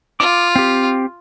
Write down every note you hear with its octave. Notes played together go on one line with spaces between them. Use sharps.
F4 D6
C4 G4